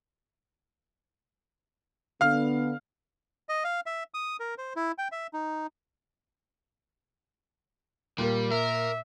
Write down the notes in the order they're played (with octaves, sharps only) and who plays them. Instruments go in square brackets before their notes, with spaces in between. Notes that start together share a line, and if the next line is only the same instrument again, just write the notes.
[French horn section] D3 B3 [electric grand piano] F5 F6
[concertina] D#5
F5
E5
D#6
A#4
C5
E4
G5
E5
D#4
[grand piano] A#2 A#3 [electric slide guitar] G3
[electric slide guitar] A#4 [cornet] E5